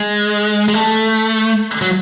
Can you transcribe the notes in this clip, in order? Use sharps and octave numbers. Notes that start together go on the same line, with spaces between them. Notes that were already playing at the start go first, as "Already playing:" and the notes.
Already playing: G#3
G#3
A3
F#3